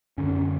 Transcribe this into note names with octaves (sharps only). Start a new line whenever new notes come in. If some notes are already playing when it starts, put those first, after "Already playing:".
F#2 D3 C#4